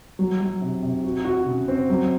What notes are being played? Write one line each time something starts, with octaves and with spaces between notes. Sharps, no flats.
F#3
F#3
C3
C3
F#4
F#4
C#3
C4
F#3